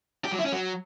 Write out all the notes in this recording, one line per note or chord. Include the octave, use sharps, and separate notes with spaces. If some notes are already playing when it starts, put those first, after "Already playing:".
G4
F#3
E4
C#4
F#3